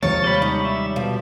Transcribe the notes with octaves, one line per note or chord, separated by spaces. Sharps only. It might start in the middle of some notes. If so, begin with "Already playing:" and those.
D#2 C3 D#3 F3 G#3 C#5 A6
G3 B5
C#4 D#4
E5
B2 F3